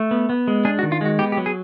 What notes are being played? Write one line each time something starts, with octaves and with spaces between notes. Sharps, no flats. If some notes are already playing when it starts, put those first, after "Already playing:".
Already playing: A3
B3
B3
G#3
D4 G#4
F#4
D#3
F4
G#3 F#4
B3 G4
G4
F#3
G#4